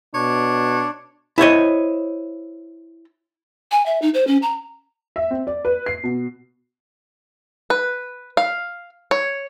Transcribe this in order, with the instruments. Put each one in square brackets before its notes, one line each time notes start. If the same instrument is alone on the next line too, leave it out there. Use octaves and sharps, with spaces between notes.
[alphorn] B2 [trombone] D4 [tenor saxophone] C#5
[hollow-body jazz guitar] E4 C5 C#5 D#5
[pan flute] G#5
E5
D#4
C5
C#4
A#5
[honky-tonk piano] E5
C4
D5
B4
C7
B2
[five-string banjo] B4
F5
C#5